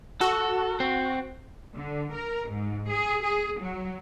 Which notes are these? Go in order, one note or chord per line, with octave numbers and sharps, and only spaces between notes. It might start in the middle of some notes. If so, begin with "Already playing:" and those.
F#4 A4
C4
D3
A#4
G#2
G#4
G#4
F#3